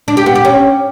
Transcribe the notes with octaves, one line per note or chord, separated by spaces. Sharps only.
D4
G4
B3
G4
C#4